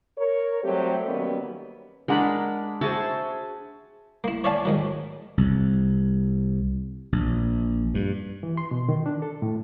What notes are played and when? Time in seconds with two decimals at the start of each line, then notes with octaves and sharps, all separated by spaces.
0.17 A#4 C#5
0.64 F#3 G3 A3 C4 G4
1.06 D#3 F#3 G3 A#3 B3 C#4
2.08 G#3 D4 A#4 F#5 A#5 B5
2.81 F#4 G#4 C5 E5 A5
4.24 A#3 E4
4.44 C#5 D5 E5 F5 G#5 A5
4.65 G#2 D#3 F#3
5.38 C2
7.12 A#1
7.94 G2
8.43 E3
8.57 C6
8.71 B2
8.89 D#3
9.06 D4
9.22 A4
9.42 A2